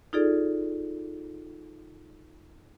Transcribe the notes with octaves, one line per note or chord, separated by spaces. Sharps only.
D#4 F4 G#4 A4 D5